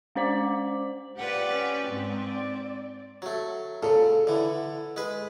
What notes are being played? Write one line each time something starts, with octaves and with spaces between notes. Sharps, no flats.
G#3 C#4 C5 D5 D6 F#7
F4 G4 B4 D5 F#5
C#4
G#2 C4
D5
F#3 A3
A#2 C#3 A4
D3 E3
G#3 B4